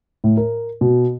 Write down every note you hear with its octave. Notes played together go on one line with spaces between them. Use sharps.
A2
A#4
B2